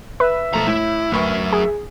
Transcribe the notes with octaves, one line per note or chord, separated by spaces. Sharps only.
B4 E5
B1 F3 A3 A#5
A2 E4
D2 F#3 A#4 B4 C#6
G#4